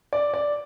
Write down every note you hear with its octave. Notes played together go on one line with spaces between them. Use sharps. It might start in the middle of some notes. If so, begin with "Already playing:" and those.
D5
D5